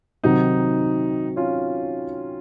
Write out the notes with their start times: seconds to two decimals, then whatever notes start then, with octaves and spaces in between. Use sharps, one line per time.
0.23 C3 D#3 F#3 C4 D#4 F#4
1.36 C#4 F4